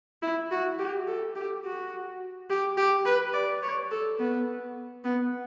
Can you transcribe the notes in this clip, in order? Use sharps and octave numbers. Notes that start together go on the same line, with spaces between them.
E4
F#4
G4
A4
G4
F#4
G4
G4
B4
D5
C#5
A4
B3
B3